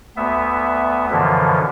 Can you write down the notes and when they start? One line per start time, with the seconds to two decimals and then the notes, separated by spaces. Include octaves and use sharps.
0.16 D2 B3 E5
1.11 F#2 B2 D3 E3 F3